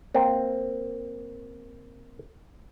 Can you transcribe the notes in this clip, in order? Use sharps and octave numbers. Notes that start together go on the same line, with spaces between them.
A#3 C4